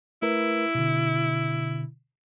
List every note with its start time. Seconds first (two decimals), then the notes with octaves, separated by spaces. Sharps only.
0.22 A3 E4 A#4 B4
0.75 B2 D3